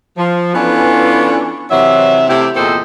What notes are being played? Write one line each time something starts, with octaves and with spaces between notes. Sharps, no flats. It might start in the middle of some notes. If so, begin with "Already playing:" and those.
F3
E3 B3 C#4 D4 F4 A4
C3 E3 F#3 E5
C3 A3 E4 G4
E2 A#2 C4 A4 C5 D#5